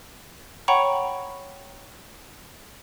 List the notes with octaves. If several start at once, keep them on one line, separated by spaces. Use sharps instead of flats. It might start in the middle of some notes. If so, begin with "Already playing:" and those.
C#5 F#5 G5 A#5 B5 C#6